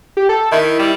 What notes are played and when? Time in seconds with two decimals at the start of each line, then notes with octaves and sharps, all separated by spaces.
0.17 G4
0.29 A4
0.52 D#3 E4
0.79 G3